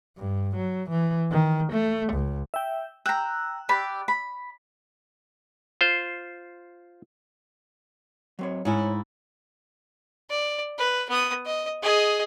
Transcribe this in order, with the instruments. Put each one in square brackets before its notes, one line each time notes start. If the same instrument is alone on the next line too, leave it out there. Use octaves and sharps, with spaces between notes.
[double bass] G2
F#3
E3
D#3
A3
C#2
[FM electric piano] E5 G5
[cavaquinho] G5 A#5 [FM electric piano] E6 F#6
[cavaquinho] G4 D5 B5
B5
[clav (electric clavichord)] F4 C5
[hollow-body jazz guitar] F#3 C4 C#5
[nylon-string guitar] G#2 E4 [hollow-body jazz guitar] C#5 G#5
[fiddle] D5
B4
B3 D#6
D#5
G#4 D#5